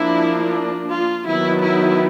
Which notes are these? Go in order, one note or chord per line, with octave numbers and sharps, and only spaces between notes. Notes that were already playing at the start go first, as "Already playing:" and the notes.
Already playing: F3 A#3 D4 E4
F4
D#3 F#3 B3 D#4 E4
E4